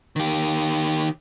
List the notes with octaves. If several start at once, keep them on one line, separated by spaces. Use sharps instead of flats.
D#3 G4